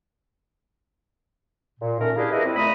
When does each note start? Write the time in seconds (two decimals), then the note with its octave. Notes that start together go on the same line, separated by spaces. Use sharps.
1.80 A#2
2.00 D#3 A3 C#4 A#4
2.16 A#3 D4 E4 G4 G#4
2.31 G3 E4 G#4 A#4 B4 D#5
2.45 C4 E4
2.56 C#2 A#2 A3 A#5 B5 D#6